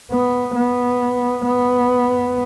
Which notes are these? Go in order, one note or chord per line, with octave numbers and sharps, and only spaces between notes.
B3
B3
B3